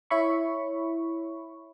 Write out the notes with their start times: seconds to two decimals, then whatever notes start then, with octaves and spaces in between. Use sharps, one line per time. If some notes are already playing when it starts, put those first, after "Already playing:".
0.10 E4 C#5 E5 B5 C#6